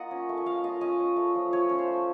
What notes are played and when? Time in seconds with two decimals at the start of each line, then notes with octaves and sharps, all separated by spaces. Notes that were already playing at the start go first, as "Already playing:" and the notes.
Already playing: A#3 F4 D#5 F#5
0.11 C#4
0.29 A3
0.37 D#5
0.46 A3 F5
0.64 F4 D#5
0.81 C#4 D#5
1.00 C#4
1.16 A3
1.35 F3
1.52 F3 C#5
1.69 C#4
1.79 C5
1.87 A3